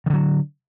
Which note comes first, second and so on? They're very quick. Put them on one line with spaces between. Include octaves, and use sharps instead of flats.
D#3 D3 F#3